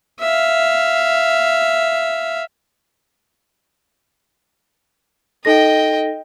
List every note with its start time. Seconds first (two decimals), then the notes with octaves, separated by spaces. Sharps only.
0.20 E5 F5
5.45 D#4 A4 D#5 G5 A#6